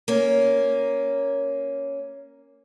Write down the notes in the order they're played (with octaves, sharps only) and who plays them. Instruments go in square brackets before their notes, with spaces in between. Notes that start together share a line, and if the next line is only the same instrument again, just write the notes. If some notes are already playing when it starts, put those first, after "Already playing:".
[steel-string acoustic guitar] A#3 C#4